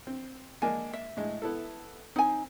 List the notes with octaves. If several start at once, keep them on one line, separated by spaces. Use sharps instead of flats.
C4
G#3 A#3 D4 G#5
E5
A2 G#3
B3 E4 A4
C4 D#4 G#5